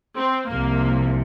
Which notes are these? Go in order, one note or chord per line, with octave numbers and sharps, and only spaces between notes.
C4
C2 C3 F3 A#3